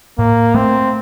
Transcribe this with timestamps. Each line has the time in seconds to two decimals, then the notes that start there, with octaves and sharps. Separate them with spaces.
0.18 A2 A#3
0.54 A3 C4